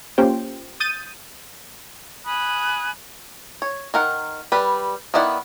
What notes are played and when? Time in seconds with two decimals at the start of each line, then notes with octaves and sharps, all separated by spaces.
0.18 A#3 C#4 F4 G4 C5 G5
0.80 D#6 G6 A6 D#7
2.25 G#5 B5 D#6 F#6
3.62 C#5
3.94 D#3 A#4 F#5
4.52 G3 B4
5.14 D#3 B3 E4 D5 F#5